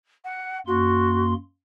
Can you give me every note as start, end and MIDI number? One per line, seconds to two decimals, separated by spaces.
0.24 0.58 78
0.67 1.34 42
0.67 1.34 58
0.67 1.32 66
0.67 1.34 84